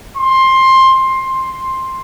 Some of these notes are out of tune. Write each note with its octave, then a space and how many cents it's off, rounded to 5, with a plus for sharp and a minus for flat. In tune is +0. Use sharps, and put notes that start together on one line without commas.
C6 +15
C6 +5